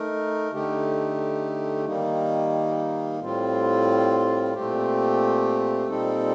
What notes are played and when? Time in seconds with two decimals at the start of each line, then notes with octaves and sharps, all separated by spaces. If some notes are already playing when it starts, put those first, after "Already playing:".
Already playing: A3 D#4 A#4
0.51 D3 A3 D#4 G4
1.85 D#3 G3 A#3 D#4
3.20 A2 G3 C4 F4
4.53 A#2 A3 C4 G4
5.88 A#2 G3 C4 D#4 A4